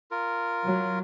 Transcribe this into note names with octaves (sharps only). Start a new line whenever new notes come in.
F4 A#4
F#3